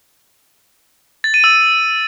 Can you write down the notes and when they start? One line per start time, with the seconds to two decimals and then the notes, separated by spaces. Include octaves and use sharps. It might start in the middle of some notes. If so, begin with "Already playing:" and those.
1.24 A6
1.34 D#7
1.44 E6